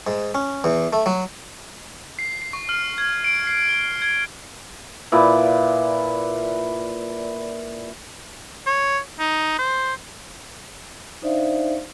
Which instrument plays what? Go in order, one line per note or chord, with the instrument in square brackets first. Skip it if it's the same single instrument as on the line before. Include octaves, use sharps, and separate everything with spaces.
[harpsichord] G#2
C#4
E2
A3
F#3
[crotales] C7
C7
C#6
F6
G#6
D7
C7
G7
G#6
[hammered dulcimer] A#2 E4 B4 D5
[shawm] C#5
D#4
C5
[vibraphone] D4 D#4 C5 D5 E5 F5